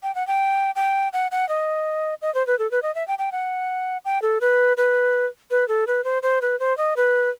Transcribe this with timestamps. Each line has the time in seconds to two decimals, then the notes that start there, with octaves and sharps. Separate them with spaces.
0.03 G5
0.15 F#5
0.27 G5
0.76 G5
1.13 F#5
1.31 F#5
1.49 D#5
2.22 D#5
2.35 C5
2.47 B4
2.59 A4
2.71 B4
2.83 D#5
2.95 E5
3.08 G5
3.19 G5
3.32 F#5
4.05 G5
4.22 A4
4.41 B4
4.77 B4
5.51 B4
5.68 A4
5.87 B4
6.04 C5
6.23 C5
6.42 B4
6.60 C5
6.77 D#5
6.97 B4